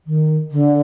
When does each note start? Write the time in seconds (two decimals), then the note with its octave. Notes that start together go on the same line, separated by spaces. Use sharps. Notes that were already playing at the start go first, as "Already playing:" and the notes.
0.07 D#3
0.51 D3